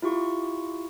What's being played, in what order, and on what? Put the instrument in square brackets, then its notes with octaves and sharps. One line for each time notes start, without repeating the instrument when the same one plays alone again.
[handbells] E4 F4 G4 C#6